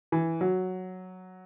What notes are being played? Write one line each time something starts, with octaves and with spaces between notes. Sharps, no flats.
E3
F#3